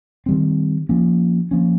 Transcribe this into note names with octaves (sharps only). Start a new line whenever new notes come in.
D#3 G3 C4
F3 A#3 C#4
F3 A#3 C#4